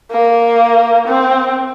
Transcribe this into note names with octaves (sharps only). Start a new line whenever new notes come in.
A#3
C4